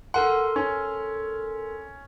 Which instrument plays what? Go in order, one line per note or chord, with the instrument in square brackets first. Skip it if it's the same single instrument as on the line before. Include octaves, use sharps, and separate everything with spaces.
[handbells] A4 A#4 C6 [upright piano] F#5
[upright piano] C#4